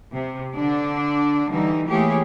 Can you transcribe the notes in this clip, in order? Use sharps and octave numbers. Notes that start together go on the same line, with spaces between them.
C3
D3 D4 D5
D3 E3 G3 D#4
E3 A3 A#3 G4 G#4 C#5